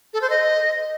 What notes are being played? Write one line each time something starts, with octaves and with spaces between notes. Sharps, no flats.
A4
C5
D#5